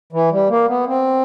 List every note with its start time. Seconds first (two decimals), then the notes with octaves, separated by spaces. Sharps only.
0.13 E3
0.32 G3
0.49 A#3
0.68 B3
0.87 C4